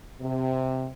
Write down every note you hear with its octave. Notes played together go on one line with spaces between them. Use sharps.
C3